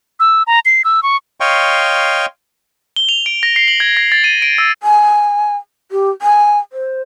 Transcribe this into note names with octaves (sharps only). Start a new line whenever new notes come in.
E6
A#5
C7
E6
C#6
C#5 D#5 F5 G5 C6 C#6
G7
F7
D7
A#6
C7
F#7
G#6
A#6
A6
D#7
D7
E6
G#5
G4
G#5
C5